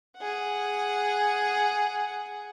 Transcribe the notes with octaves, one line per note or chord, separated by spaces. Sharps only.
G#4 F#5